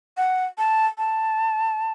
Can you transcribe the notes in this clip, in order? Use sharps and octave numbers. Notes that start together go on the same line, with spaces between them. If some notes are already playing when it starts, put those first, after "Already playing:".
F#5
A5
A5